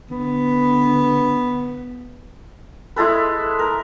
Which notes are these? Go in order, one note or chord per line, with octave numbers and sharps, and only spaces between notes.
D3 B3
G#3 E4 A4 B4
A#4